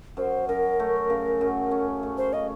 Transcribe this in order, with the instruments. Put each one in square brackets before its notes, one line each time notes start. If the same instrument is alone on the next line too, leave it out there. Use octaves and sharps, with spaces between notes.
[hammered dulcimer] F#2 [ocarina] C5
[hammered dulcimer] F#2 [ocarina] A#4
[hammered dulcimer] A3
C#3
F#2
C#4
A3
[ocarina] C5
[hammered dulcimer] C#3 [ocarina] D#5